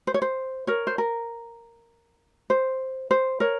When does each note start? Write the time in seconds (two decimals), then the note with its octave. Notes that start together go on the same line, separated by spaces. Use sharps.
0.07 C5
0.14 C#5
0.22 C5
0.67 A#4 C#5
0.87 C5
0.98 A#4
2.50 C5
3.11 C5
3.40 A#4 C#5